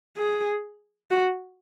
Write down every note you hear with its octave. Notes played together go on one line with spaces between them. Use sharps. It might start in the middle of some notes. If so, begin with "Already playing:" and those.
G#4
F#4